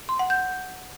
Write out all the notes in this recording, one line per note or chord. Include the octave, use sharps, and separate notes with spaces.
C6
F#5
G6